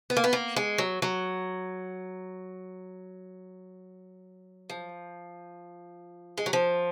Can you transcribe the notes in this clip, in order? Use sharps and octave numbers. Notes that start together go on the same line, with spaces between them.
B3
A#3
B3
A#3
G#3
F#3
F#3
F3
G#3
F#3
F3